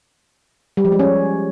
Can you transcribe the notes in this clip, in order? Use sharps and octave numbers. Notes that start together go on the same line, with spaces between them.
G3
F3
G#3
C#4